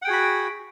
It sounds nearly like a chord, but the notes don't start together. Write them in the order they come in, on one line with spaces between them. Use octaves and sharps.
F#5 G5 G#4 F#4 B5